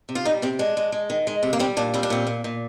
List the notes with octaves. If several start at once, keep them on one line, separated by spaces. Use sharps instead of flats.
C3
F4
G3 D#4
C3 C4
G#3 D4
G#3
G#3
D#3
G#3
C3
A#3
G3 C4
A#2 D4
G3 C4
D4
A#2 C4
A#2
A#2